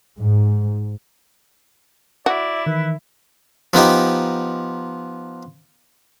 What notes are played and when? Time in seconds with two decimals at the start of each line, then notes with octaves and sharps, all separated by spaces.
0.19 G#2
2.26 E4 F#4 D5
2.66 D#3 E3 B4
3.74 F3 B3 D#4 G4